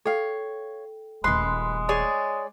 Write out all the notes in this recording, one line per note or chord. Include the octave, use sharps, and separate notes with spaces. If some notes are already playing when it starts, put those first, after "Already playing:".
A4 C#5 F5 G5
D#1 G#3 A3 B4 C6 F#6 C7
G#4 C#5 D5